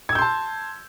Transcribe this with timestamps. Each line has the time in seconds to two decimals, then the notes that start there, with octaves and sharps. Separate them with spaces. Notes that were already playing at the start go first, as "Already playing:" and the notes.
0.09 G#6
0.12 E6
0.15 G6
0.18 C6
0.22 A5